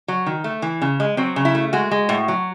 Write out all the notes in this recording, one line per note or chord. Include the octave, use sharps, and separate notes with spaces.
F#3
D#3
A3
E3
C#3
G#3
F#3 C4
C#3
E4
A3
G#3 F#4
G#3
A2
F#3